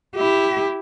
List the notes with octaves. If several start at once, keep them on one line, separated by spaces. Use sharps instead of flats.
E4 G4